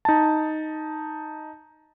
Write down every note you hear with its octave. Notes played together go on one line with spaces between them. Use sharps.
D#4 A5